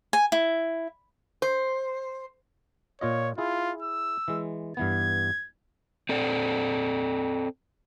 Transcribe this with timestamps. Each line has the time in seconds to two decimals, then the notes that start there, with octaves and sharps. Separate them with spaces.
0.13 G#5
0.32 E4
1.42 C5
3.01 A#2 F4 C#5 D#5
3.38 E4 F4 G#4
3.82 E6
4.28 E3 G#3
4.77 G2 E3 B3 G#6
6.09 C4 A4 D5